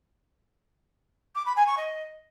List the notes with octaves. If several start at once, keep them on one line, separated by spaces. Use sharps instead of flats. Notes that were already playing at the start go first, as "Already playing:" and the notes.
D6
B5
G#5
C#6
D#5